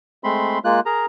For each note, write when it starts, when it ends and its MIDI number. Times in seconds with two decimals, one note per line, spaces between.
0.24 0.59 56
0.24 0.59 57
0.24 0.59 60
0.24 0.59 83
0.24 0.59 84
0.64 0.80 56
0.64 0.80 58
0.64 0.80 65
0.64 0.80 90
0.86 1.06 68
0.86 1.06 70
0.86 1.06 82